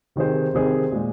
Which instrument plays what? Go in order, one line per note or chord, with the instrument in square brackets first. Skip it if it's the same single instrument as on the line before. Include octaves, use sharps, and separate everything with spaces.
[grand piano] C3 D#3 C4 G#4 C5
C3 D#3 C4 G#4 C5
A#2 G#3